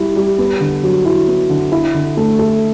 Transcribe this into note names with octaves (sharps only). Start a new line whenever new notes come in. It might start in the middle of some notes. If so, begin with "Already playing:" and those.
Already playing: G3 E4
G3
B3
D3
F#3
E4
B3
D3
E4
D3
A3
A4